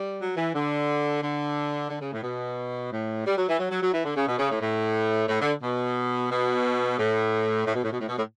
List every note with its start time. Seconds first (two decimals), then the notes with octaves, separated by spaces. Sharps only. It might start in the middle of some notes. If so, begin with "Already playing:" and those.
Already playing: G3
0.21 F#3
0.37 E3
0.55 D3
1.22 D3
1.90 D3
2.01 C#3
2.12 A2
2.23 B2
2.92 A2
3.26 G3
3.37 F#3
3.49 E3
3.60 F#3
3.70 F#3
3.82 F#3
3.93 E3
4.05 D3
4.16 C#3
4.28 B2
4.39 C#3
4.51 A2
4.61 A2
5.29 A2
5.41 D3
5.63 B2
6.31 B2
6.99 A2
7.67 A2
7.75 B2
7.84 A2
7.92 B2
8.00 A2
8.09 B2
8.17 A2